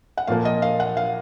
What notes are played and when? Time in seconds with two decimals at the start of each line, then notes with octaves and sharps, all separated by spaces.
0.17 F#5
0.27 A#2 F3 A#3 F5
0.45 D#5
0.62 F5
0.80 F#5
0.97 F5